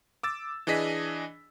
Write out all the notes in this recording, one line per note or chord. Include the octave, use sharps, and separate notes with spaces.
D6 E6 A6
E3 D4 G#4 D#5 B6